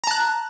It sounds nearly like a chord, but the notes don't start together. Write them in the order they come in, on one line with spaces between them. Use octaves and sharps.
A#5 A5 F#6